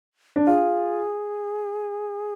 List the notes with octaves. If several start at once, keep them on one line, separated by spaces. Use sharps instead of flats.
D4
F4 G#4